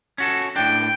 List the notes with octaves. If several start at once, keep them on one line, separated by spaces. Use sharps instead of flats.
C#4 F#4 A4
A2 D4 G5